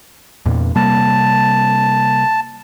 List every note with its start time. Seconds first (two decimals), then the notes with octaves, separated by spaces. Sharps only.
0.46 E2 A#2
0.76 C3 G3 A#3 A5